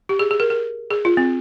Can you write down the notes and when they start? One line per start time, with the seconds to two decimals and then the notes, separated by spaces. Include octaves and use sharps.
0.09 G4
0.19 G#4
0.31 G#4
0.40 A#4
0.50 A#4
0.91 G#4
1.05 F4
1.17 C4